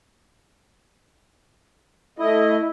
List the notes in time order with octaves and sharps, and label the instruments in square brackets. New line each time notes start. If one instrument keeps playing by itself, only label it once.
[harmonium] A3 D#5 [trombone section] E4